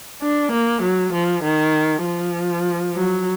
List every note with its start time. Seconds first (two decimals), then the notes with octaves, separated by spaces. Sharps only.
0.22 D4
0.52 A#3
0.82 F#3
1.13 F3
1.44 D#3
2.04 F3
2.95 F#3